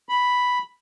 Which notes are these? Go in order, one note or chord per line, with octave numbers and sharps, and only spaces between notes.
B5